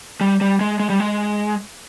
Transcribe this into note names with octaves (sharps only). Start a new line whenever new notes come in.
G3
G3
G#3
G#3
G3
G#3